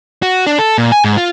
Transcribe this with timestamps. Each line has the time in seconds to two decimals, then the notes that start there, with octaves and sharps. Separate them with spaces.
0.23 F#4
0.47 D4
0.59 A4
0.78 A#2
0.92 G#5
1.04 G#2
1.17 F4